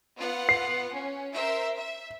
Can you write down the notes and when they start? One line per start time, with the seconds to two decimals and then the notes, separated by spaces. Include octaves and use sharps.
0.18 B3 F4 F#5
0.49 C7
0.95 C#4
1.33 A#4 C5 E5
1.77 E5